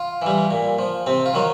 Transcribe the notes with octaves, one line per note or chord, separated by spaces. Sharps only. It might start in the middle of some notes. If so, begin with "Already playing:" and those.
Already playing: F4
E3 G3
A#2
F3
C3 C4
F4
D#3 F#3